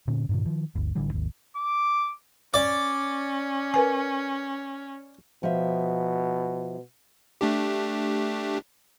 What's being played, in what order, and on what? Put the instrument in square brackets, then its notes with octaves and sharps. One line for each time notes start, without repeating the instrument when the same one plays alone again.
[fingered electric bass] A#2 D3 C#4
G2 A#2 D3
D#3 F3
G1 D2
A1 D3 E3 G3
G#1 D#2
[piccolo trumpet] D6
[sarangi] C#4 [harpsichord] D5
[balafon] A#4 B4 G#5
[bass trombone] B2 [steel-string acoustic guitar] F3 E5
[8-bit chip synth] A3 D4 G4